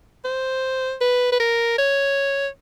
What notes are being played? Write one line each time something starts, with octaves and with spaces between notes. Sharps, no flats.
C5
B4
B4
A#4
C#5